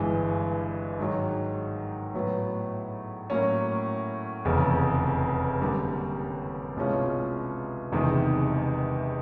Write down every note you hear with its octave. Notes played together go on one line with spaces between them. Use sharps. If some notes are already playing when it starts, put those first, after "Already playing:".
Already playing: G1 G2 E3 G#3
G#2 D#3 F#3
A2 F#3 B3
A2 F#3 A#3 C#4
F1 E2 C#3
F#2 D3 G3 A#3
C2 B2 G#3 C#4 F4
F#1 E2 C3 D#3 G#3